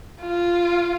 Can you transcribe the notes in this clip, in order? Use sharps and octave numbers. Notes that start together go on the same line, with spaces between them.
F4